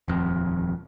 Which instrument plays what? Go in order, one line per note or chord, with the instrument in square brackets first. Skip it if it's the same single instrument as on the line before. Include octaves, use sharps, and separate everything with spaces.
[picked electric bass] D#1 F2